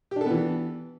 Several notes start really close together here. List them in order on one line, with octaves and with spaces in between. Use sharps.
G4 D4 A4 B3 E3